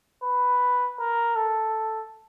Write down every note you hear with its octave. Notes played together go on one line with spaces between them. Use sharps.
B4
A#4
A4